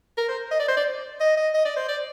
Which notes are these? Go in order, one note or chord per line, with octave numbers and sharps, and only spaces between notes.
A#4
C5
D#5
D5
C5
D5
D#5
D#5
D#5
D5
C5
D5